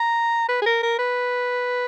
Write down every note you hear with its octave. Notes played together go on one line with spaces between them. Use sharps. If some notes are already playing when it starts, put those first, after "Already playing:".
Already playing: A#5
B4
G#4
A#4
A#4
B4